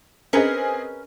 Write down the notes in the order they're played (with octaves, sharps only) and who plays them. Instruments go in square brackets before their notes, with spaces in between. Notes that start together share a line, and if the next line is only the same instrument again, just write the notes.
[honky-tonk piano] C4 G#4 D#5 [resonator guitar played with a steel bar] C#4 A#4 B4